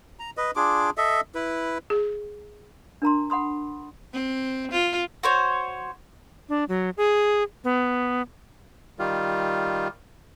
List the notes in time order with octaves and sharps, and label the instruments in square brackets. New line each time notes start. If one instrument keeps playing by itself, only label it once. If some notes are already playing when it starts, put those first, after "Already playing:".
[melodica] A#5
B4 D#5
D4 F4 G#4 D6
A4 D#5 E5
E4 B4
[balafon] G#4
[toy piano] D4 A#4 A#5 C6
F#5 B5 C6 D#6
[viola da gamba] C4
F4
[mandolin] F#4 C5 C#5
[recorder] D4
F#3
G#4
B3
[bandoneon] D#3 G3 F4